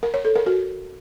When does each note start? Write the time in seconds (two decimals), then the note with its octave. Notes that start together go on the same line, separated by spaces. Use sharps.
0.03 A#4
0.14 C#5
0.25 A4
0.36 A#4
0.46 F#4